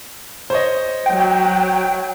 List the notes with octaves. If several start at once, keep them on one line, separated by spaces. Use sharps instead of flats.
C5 C#5 D#5
F#3 G5